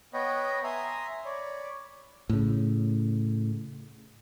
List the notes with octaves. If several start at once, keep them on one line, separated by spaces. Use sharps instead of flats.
B3 B4 C#5 D#5 G5 B5
E5 G#5 A#5 C6 D#6
C#5 D5 B5
A2 C#3